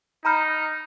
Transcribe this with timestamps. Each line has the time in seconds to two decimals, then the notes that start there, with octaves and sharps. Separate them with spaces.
0.25 D#4 A#5 B5 F6